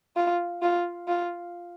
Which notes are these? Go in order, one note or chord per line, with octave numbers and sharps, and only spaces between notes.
F4
F4
F4